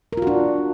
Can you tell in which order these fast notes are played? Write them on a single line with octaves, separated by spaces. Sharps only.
A#4 F4 F#4 D4